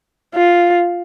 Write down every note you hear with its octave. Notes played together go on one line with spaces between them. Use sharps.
F4